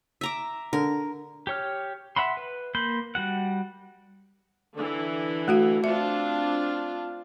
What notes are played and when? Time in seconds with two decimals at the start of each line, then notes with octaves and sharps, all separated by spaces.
0.21 E5 A#5 D6
0.73 D3 A#4
1.47 G4 C#5 F6
2.16 E5 F#5 B5 C6
2.37 B4
2.75 A#3 B5 C6 G6
3.15 G3 F#4 F#5
4.75 D3 E3
5.48 A3 F#4 F5
5.84 C4 D4 F4 E5